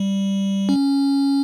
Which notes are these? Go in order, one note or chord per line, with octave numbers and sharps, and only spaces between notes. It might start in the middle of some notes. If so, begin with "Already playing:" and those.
Already playing: G3
C#4